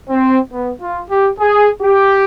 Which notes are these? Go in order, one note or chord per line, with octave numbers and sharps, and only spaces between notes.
C4
B3
F4
G4
G#4
G4